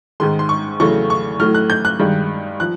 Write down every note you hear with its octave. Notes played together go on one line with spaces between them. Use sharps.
G#2 D#3 G#3 C6
C6
C#6
E2 C#3 F#3 A3 C#6
C#6
A2 F#3 A3 F6
F#6
G6
F#6
G2 D#3 G#3
F3 F#6